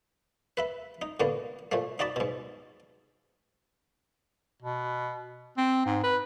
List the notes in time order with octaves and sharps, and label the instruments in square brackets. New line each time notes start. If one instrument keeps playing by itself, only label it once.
[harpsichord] B4 E5 B5
D#4
A2 D3 A#3 B3
A#2 F3 A3
D#4 F#4 D5 A5 B5
G#2 B2
[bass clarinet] B2
C4
G#2
B4